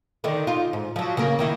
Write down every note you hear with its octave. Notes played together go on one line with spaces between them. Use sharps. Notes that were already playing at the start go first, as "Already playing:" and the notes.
D3 D#3 D#4
D#4 F4
G#2
F3 F#3
C#3 A#3 A#4
D#3 A#3 E4